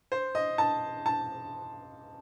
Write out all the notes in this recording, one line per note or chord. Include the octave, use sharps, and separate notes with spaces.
C5
D#5
A5
A5